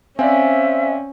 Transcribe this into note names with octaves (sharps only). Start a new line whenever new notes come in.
C4 C#4 C5 D5 E5 F5 G#5